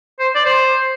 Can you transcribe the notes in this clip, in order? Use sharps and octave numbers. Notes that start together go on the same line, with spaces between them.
C5
D5
C5